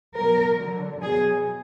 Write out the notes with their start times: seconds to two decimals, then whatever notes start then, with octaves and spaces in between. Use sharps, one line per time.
0.16 B2 F#3 A#4
0.58 D3 F#3
1.02 B2 F#3 G#4